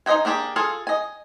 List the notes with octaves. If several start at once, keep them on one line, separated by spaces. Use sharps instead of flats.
D#4 C5 D#5 G5 G#5
A#3 D4 G4 G#4
F4 G#4 A4 F5 G#5
D#5 G#5